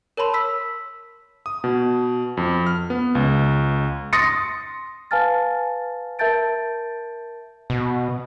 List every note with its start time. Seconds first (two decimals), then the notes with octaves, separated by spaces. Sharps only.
0.17 A#4 C#5 A5 B5 C6
0.34 E6 B6
1.46 D#6
1.64 B2
2.37 F2
2.66 F6
2.90 B3
3.15 C#2
4.13 C6 D#6 A6 A#6 C#7
5.11 B4 F5 G#5 A5 F6 A6
6.19 A#4 E5 A5 G6 A6 D7
7.70 B2